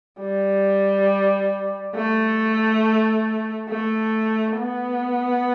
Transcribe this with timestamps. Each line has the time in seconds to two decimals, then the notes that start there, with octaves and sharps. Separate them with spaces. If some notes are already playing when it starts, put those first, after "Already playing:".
0.21 G3
1.96 A3
3.69 A3
4.58 B3